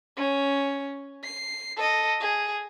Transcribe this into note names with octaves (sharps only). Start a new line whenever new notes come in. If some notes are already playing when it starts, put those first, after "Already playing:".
C#4
C7
A4 D#5
G#4